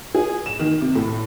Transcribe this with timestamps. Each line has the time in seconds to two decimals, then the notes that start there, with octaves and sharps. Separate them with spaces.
0.15 G#4
0.46 E7
0.59 D#3
0.81 C3
0.96 A2